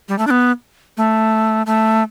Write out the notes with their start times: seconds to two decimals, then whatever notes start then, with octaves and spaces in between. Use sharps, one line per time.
0.09 G3
0.19 A3
0.27 D4
0.30 B3
0.97 A3
1.66 A3